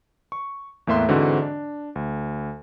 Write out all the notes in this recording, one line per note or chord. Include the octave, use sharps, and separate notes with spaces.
C#6
E2 A2 A#3 E5 C6 F#6
G#2 D3 E3 C4 F#4
D4
D2